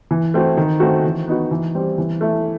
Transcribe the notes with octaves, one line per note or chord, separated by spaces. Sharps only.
E3
A3 C4 F#4
D#3
A3 C4 F#4
E3
B3 D#4 F#4
E3
G3 C4
E3
A3 E4